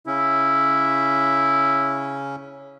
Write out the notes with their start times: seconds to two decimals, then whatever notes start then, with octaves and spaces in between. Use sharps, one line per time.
0.07 C#3 C#4 E4